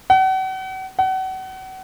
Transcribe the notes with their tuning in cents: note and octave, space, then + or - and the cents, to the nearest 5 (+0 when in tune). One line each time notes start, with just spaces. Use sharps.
F#5 +40
F#5 +35